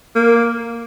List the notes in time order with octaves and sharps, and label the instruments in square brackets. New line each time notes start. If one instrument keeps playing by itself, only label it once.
[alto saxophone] A#3